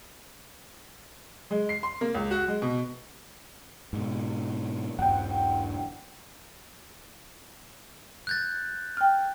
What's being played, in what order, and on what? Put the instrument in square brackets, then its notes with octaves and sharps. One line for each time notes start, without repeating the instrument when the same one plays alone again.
[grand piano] G#3
C7
C6
A#3
C#2
F#4
G#3
B2
[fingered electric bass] G#2 B2
[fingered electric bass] D#1 G2 [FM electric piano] F#5 G5
[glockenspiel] F#6 G6 A6
[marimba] G5 F6